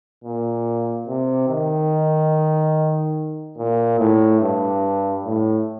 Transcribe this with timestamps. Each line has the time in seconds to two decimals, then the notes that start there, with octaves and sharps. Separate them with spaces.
0.24 A#2
1.07 C3
1.49 D#3
3.58 A#2
3.99 A2
4.41 G2
5.25 A2